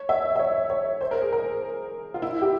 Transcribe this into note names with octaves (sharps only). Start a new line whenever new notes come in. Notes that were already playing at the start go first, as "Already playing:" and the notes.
Already playing: C#5
E5
E5
C#5
C#5
C5
A#4
G#4
A#4
F4
E4
G4